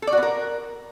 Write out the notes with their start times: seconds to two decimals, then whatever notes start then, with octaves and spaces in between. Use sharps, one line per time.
0.02 A4
0.07 D5
0.12 F#4
0.18 B3
0.23 A#4